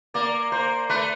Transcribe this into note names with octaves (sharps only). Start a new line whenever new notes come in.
A#3 D5
A#3 C5
A3 B4